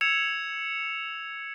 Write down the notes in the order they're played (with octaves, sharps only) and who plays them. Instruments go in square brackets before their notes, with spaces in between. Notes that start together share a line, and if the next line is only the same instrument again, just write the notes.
[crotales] E6 G#6 C#7 E7 F7